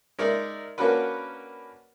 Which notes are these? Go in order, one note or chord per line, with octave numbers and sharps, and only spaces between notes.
G#3 D#4 A#4 D5 E5
A#3 C#4 D4 F#4 A#4 B4